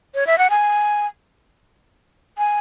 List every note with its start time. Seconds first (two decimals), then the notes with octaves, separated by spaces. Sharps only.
0.15 C#5
0.27 E5
0.38 F#5
0.50 G#5
2.38 G#5